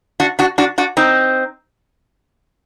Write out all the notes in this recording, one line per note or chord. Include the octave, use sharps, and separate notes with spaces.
D4 F#4
D4 F#4
D4 F#4
D4 F#4
C4 D#4